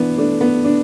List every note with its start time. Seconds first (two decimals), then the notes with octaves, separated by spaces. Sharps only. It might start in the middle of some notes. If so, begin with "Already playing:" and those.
Already playing: E3 B3 D4
0.18 A3 D4
0.41 B3
0.65 D4